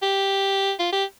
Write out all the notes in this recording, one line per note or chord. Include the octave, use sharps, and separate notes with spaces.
G4
F4
G4